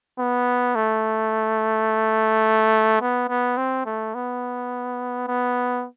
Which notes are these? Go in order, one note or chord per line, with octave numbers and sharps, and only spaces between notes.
B3
A3
B3
B3
C4
A3
B3
B3